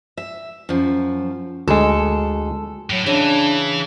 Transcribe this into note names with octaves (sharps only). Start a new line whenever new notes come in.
E5
F#2 F3
D2 G#3 A4
A2 F#3
C#3 E3 D4 E5 A#5